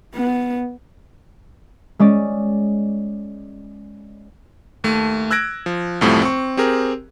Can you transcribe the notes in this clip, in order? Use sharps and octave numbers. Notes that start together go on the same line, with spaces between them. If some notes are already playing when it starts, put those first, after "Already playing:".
B3
G#3 C#4 D5
D#2 A3
E6 F#6 G#6 A#6 D7
F3
C2 F#2 A2 C3 F3 A3
C4 C#6
C4 G4 G#4 A#4